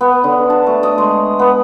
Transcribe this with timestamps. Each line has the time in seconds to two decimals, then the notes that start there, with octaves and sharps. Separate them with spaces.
0.01 B3
0.24 D3
0.50 A5
0.67 A3
0.83 D#5
0.98 G#3
1.39 B3